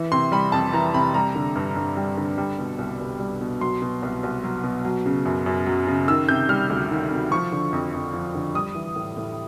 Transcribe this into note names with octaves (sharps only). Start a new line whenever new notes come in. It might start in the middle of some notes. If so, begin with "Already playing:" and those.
Already playing: E3
C3 C6
G3 B5
F2 A5
E3 A#5
C3 B5
G3 A#5
D3
G2
G2
G3
D3
G3
B2
C2
C2
G3
B2
F#3 C6
B2
C2
C2
F#3
B2
F#3
C#3
F#2
F#2
F#3
C#3
D#3 E6
C3 G6
G3 F6
D2
D#3
C3
F3 C#6
D3
F2
F2
F3
D3
G3 D#6
E3
A2
A2